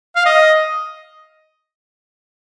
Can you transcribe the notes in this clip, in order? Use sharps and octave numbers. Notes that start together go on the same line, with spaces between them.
F5
D#5